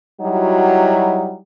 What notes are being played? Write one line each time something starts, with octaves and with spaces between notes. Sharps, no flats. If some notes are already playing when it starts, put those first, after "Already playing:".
F#3 G3 D#4 E4 F#4